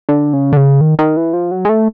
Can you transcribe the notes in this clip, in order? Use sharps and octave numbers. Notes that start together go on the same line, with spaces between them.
D3
C#3
D3
C#3
D#3
D#3
E3
F3
F#3
G#3
A3